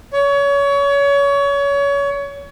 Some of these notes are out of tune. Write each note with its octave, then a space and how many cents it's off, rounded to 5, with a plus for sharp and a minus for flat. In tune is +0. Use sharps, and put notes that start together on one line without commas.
C#5 +25